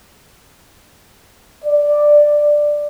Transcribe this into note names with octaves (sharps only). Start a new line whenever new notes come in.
D5